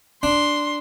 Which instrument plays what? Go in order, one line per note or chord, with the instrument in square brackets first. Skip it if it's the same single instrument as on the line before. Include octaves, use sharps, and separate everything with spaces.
[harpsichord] D4 [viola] C6